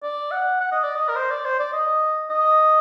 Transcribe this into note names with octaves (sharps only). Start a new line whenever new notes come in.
D5
F#5
F#5
D#5
D5
D#5
A#4
C5
D5
C5
D5
D#5
D#5